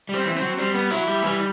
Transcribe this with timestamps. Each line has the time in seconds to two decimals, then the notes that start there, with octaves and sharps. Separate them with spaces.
0.09 G3
0.15 C4
0.26 E3
0.37 F#3 C4
0.58 G3 C4
0.74 B3
0.91 F#3 E4
1.07 G3
1.24 E3 G3